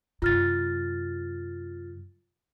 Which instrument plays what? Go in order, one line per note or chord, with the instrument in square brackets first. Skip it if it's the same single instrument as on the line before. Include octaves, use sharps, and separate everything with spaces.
[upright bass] F#2 C3 [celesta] F4 F6 A6